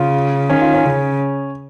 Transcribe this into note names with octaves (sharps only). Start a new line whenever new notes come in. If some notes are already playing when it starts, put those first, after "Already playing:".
Already playing: C#3 F4
D#3 C#4
F4
C#4
C#3